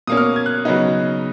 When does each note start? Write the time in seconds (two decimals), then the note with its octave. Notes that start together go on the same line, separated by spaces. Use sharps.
0.07 B2 A#3 C#4 D#6
0.17 F6
0.36 G#6
0.46 F#6
0.65 C#3 F#3 B3 D#4